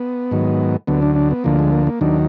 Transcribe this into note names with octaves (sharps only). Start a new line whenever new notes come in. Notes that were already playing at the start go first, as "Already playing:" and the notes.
Already playing: B3
G#2 D#3 F#3
D2 D3 F#3 B3
D4
D4
B3
D2 D3 F3 A#3
G#3
A#3
A#3
D#2 D#3 F#3 D4